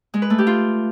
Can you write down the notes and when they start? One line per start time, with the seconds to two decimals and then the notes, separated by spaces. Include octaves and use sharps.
0.14 G#3
0.22 B4
0.30 A3
0.38 G4
0.47 F4